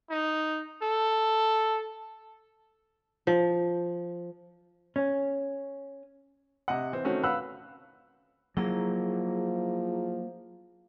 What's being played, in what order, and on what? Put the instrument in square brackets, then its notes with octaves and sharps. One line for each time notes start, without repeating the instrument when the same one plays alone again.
[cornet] D#4
A4
[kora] F3
[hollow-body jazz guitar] C#4
[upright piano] C3 D#5 F#5
E3 C4
D#3 A3 C4 C#4 D#4 F#4
B4 F5 F#5 B5 E6 F#6
[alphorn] F3 [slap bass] F#3 A#3 [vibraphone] E4 G#4 A#5